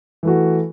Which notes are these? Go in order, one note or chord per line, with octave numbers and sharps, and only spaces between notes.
E3 A3 F#4